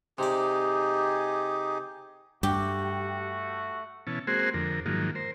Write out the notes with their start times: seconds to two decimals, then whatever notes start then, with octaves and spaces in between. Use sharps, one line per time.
0.18 C3 D#4 G4 G#4 D5
2.43 G2 A3 F#4 G4
4.07 B2 E3 C#4 A5
4.27 G#3 A#3 C4 F#4 G#4 C5
4.54 F2 D3 A#4
4.86 G#2 D#3 F3 F#3 A#3
5.15 A#4 C5